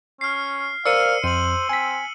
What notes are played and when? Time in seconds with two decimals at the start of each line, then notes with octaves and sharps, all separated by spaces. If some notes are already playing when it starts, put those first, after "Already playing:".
0.21 C#4 F6 C7
0.86 A#4 C5 D5 F5 E6 C#7 D#7
1.24 F2 C5 D#7 F#7
1.69 C4 G#5 B6